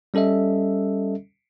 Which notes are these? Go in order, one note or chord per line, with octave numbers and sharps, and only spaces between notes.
G3 C#4 A4 D#5 E5